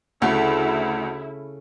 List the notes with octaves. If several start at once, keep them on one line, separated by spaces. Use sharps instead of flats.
D2 C#3 A3 E4